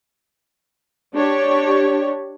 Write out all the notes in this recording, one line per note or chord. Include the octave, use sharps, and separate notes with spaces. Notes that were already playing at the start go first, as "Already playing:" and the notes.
D4 G4 C#5